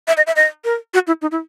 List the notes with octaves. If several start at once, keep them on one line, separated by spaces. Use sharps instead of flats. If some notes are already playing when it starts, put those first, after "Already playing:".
E5
D#5
E5
D#5
A#4
F#4
E4
D#4
E4